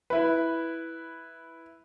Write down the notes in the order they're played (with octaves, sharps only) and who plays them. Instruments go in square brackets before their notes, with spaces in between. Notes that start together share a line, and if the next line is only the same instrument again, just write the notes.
[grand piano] E4 B4